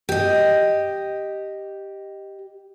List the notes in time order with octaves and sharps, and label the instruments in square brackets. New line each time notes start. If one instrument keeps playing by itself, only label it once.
[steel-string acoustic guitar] G4 D#5